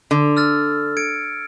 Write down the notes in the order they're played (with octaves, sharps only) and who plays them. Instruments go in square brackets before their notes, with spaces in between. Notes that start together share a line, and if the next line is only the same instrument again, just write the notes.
[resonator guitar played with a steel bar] D3
[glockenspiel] E6 F6 A6
G#6 C#7 D7